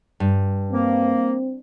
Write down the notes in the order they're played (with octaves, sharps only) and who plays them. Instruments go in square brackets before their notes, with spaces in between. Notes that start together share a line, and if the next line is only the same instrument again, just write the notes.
[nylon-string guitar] G2
[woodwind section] A#3 [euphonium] C4